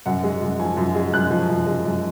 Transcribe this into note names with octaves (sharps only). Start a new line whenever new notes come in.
F#2 F#5
G#3
F#2
F3 G#5
F#2
G#3
F#2 F#6
F3
F#2
G#3
F#2